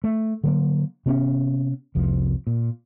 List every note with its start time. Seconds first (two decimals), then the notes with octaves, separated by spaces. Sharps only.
0.04 A3
0.44 D3 F#3 A#3
1.06 C3 B3 C#4
1.95 F1 C2 F3
2.47 A#2